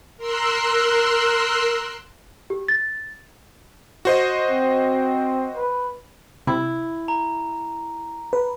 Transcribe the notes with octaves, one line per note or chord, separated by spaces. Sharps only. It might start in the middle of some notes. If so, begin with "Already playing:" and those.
A#4 C6 E6 F#6
G4
A6
F#4 C5 D#5
C4
B4
C3 E4
A#5
B4